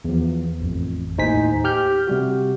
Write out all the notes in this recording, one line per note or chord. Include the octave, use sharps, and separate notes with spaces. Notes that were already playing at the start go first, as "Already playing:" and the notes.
E2 F3
A1 F2
D#2 A2 D#4 C5 G#5 B6
G4 F6 G6
C3 G3 F#4